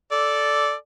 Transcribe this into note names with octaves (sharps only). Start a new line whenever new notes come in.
A4 D5